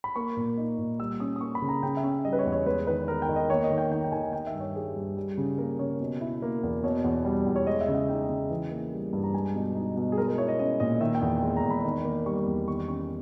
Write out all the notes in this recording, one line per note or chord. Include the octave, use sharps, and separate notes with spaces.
B5
A#3 C#6
A#2
D#4
A#2
G3 E6
C#4 D#6
D#6
A#3 C#6
B5
C#3
A#5
C#3 G5
E5
C#4
G3 D#5
B4
C#5
E2
C#5
G#3 B4
D#3 B4
B3 A#4
G5
D#3
D#5
A#3 C#5
D#5
D#3
G5
D#4 G5
G5
D#3 G#5
D#3 G5
E5
G2
C#5
G3 G#4
G2
G3
C#3
A#3 A#4
C#3 C#5
B2
E4
A#3
E2
B2 C#5
E2
G3
E2
C#5
G#3 D#5
E5
C#3
E5
D#4 G5
C#3
E3
A#3
G3
G2
A#5
G#3 G#5
B2
D#4
B2
G#4
G#3 A#4
A#4
E4 C#5
D#5
C#4 D#5
A#2 D#5
D#3 E5
G5
E2
G#3
A#5
E2
B5
D#3
A#3
G3 C#6
E2
D#3 C#6
C#4 C#6